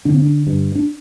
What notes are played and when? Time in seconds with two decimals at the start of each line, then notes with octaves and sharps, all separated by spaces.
0.05 D3 D4
0.14 C4
0.22 D4
0.47 G2
0.75 D4